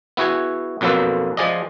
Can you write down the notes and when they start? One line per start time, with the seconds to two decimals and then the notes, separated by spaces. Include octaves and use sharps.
0.17 B3 E4 F#4 G#4 G#5
0.81 B1 F2 F#3 A#3 A4 B4
1.37 F3 G#4 D5 D#5